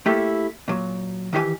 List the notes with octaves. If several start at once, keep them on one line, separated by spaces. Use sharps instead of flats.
A3 A#3 E4 G4 A4
A#2 F#3
D#3 E3 G4 C5 G#5